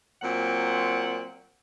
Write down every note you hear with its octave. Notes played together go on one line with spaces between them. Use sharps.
A#2 F#3 C4 F#5